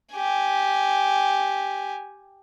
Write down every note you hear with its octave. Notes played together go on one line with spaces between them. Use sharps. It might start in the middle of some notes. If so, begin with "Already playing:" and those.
G4 G#5